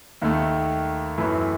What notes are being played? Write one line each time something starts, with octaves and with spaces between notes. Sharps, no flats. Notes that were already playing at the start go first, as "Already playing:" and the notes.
D#2 D#3 A3
F#2 E3 A3 E4